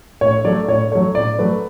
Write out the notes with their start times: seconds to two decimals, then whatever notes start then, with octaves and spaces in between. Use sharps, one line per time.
0.21 A2 C#5
0.45 F#3 A3 D5
0.68 A2 C#5
0.92 F#3 A3 C#5
1.15 A2 D5
1.38 F#3 A3 B4